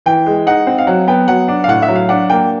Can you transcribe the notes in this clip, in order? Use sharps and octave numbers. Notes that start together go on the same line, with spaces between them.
E3 G5
G#3
D#4 F#5
C4
F5
F#3 F#5
B3 G5
F#3 F#5
D4
F5
A2 F#5
E5
F#3
F5
D4 F#5
A#3 G5